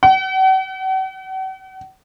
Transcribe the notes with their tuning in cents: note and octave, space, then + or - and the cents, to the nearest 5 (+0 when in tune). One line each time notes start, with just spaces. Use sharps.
F#5 +45